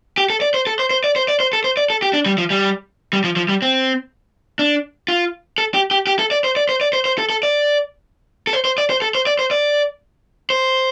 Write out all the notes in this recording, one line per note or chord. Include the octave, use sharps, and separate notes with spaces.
G4
A4
D5
C5
A4
C5
C5
D5
C5
D5
C5
A4
C5
D5
A4
G4
D4
G3
F3
G3
G3
F3
F3
G3
C4
D4
F4
A4
G4
G4
G4
A4
D5
C5
D5
C5
D5
C5
C5
A4
A4
D5
A4
C5
C5
D5
C5
A4
C5
D5
C5
D5
C5